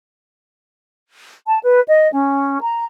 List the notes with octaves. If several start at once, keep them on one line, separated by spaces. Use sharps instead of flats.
A5
B4
D#5
C#4
A#5